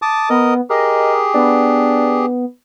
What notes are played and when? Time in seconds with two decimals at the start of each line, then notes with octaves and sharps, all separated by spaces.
0.02 A5 D6 D#6
0.30 B3 A#4 D#5
0.70 G4 G#4 A#4 D#5
1.34 B3 D4